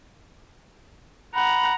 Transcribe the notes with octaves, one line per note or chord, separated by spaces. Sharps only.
F#5 A#5 B5